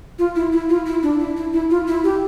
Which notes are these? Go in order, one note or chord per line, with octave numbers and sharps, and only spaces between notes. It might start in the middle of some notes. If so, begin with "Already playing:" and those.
F4
E4
E4
F4
E4
D4
E4
E4
E4
F4
E4
G4